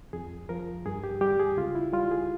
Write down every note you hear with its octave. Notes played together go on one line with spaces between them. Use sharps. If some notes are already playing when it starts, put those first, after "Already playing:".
F2 G#4
F3 A#4
G2 G#4
G4
G3 G4
G#4
C#2 F4
E4
G3 F4
G#4